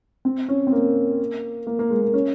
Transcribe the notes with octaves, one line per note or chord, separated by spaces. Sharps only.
C4
C#4
C4
A#3
A#3
A#3
G#3
A#3
C#4